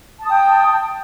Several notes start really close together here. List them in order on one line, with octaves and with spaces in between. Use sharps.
A5 D#6 G5